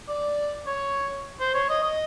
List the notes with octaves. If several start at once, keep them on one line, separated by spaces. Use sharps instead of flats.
D5
C#5
C5
C#5
D#5
D#5